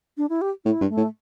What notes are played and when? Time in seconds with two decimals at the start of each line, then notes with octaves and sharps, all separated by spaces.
0.17 D4
0.30 E4
0.41 G4
0.65 A2 E4
0.82 G2
0.89 A3
0.97 A2